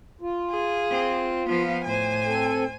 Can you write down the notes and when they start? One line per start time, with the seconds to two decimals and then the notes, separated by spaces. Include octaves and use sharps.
0.21 F4
0.50 G#4
0.90 C4
1.48 F3 B3 F5
1.84 A2 C5 G#5
2.25 C4 A4